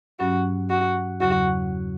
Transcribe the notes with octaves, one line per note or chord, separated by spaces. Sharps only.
G2 F#3 C#4 F#4
F#4
E2 C#3 F#3 F#4